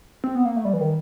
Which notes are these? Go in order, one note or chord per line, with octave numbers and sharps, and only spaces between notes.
C4
B3
A#3
A3
G3
E3
D#3